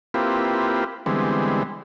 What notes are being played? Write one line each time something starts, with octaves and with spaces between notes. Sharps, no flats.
A#3 C4 E4 F4 G4 B4
D3 E3 G3 G#3 B3 C4